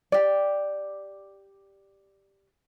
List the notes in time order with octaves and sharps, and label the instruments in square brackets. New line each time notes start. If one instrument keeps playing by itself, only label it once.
[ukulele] G4 D5